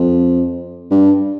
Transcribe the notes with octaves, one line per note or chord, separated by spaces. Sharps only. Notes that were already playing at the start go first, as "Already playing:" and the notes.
Already playing: F2
G2